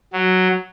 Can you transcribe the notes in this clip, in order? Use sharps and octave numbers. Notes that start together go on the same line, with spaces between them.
F#3